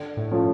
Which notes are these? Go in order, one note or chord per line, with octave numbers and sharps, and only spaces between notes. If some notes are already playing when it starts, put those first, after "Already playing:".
Already playing: D3
A2
F3 A3 C#4